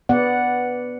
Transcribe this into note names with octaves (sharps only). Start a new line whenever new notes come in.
B3 D5 F#5